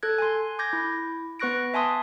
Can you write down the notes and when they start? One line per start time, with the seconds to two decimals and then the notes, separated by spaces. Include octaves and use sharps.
0.03 A4 F#6 G#6
0.18 G#5 C6
0.59 D6 G6 G#6 A#6
0.73 E4
1.40 B3 B4 C#6 F#6 A#6 D7
1.74 E5 G#5 A5 C6 D#6